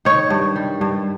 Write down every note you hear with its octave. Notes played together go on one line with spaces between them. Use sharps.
D#3 C#5
G2
G3
G2